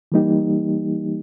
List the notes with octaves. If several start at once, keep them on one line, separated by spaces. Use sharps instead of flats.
E3 G3 A#3 D#4 G4